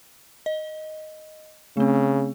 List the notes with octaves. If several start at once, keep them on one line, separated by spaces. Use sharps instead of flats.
D#5
C#3 A3 C4